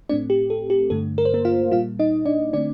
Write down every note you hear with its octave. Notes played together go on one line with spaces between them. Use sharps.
A2 A3 C4 D4 D5
G4
A4
G4
G2 D3 A3 A4
A#4
C5
A#3 A#4
F4 F5
A#2 G3 A#3 F4 F5
D#4 D#5
D4 D5
D3 A3 C4 D4 D5